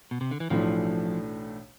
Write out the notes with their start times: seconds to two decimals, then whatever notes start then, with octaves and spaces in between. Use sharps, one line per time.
0.11 B2
0.21 C3
0.31 D3
0.40 E3
0.50 B1 A2 E3 F3 A3 D4